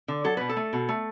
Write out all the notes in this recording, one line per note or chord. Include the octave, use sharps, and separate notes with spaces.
D3
F#3 A4
B2 B4
A4
A3
B2
A3